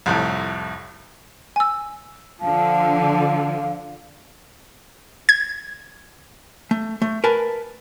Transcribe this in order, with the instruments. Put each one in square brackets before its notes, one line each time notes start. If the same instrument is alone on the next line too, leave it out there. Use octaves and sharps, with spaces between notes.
[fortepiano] C2 F2 A2
[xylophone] G#5 E6
[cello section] D3 F3 [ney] F5 [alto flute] A5
[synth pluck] G#6
[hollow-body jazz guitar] A3
A3
A#4 B4 G#5 A5